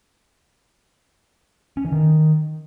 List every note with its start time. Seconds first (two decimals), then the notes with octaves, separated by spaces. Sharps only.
1.77 C#4
1.85 E3
1.92 D#3